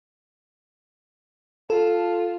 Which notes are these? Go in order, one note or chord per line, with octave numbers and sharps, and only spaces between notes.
F4 A4